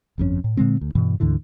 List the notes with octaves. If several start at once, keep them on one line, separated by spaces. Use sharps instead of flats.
G1 F2 G#2 C#4
A2
A#2 D3 G#3 C4
D2
G2 B2 E3
D2 G#2 D3 E3